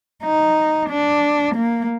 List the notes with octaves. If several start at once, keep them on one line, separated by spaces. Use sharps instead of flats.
D#4
D4
A#3